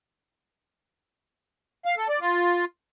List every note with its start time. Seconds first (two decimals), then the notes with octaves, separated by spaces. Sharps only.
1.85 F5
1.97 A4
2.09 D5
2.20 F4